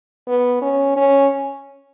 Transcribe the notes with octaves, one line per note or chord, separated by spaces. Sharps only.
B3
C#4
C#4